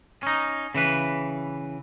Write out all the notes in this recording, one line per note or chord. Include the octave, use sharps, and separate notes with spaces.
C#4 D#4
C#3 E3 B4